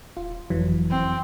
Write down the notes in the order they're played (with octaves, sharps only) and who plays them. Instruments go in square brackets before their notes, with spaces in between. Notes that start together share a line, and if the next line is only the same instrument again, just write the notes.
[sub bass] D#1 [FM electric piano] F4
[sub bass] F#1 [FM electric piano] F2 E3 F#3
[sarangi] C4